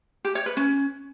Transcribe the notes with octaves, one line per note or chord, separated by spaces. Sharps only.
G4
C#5
B4
C#4